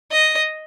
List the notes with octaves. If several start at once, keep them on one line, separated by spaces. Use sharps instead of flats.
D#5